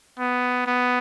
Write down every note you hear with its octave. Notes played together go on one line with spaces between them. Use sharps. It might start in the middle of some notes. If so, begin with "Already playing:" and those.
B3
B3